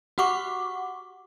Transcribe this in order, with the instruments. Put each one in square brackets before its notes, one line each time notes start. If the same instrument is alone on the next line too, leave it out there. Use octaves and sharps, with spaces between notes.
[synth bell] F#4 G4 F#5 C#6 D6